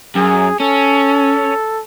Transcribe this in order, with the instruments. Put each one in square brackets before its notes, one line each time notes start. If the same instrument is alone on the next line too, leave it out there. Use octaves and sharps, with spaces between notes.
[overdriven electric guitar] F#2 [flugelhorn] G#4
[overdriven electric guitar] C#4 [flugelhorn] A4